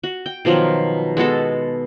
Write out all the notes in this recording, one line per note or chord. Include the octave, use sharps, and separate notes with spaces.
F#4
G5
B2 D#3 F3 F#3
G#3 B3 F#4 A4